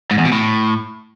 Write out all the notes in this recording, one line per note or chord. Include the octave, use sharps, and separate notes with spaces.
G#2
E2
B2
A2